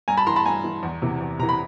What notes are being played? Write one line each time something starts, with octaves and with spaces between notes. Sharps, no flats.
G2 G#5 A#5
A5 B5
E3 A#5 C6
A5 B5
G2 G#5 A#5
E3
E2
C3 E3
E2
C3 E3 A#5
B5